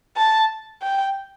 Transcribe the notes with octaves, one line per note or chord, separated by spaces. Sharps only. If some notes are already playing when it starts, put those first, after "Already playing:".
A5
G5